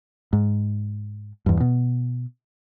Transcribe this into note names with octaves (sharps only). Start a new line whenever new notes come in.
G#2
E2 G2
B2